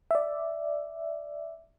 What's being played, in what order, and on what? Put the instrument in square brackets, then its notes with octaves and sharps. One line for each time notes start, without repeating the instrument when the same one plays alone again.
[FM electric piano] D5 E5